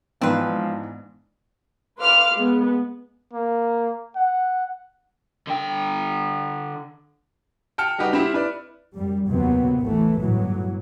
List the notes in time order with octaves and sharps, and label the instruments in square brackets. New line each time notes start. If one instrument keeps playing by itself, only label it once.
[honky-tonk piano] G#2 E3 D4 [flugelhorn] F3 [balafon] B3 D#4 [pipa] C4 B4
[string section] B4 F5 C6 D6 F6
G#3 B3
[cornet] A#3
F#5
[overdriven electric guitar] D3 G5
[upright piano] G5 A5 F6 C#7
G3 D#4 F#4 G4 B4
C4 E4 G4
E4 B4 D5
[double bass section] F#2 G3
D#2 C3 F#3 B3 C4
A1 E3 A3
G1 A2 E3 F#3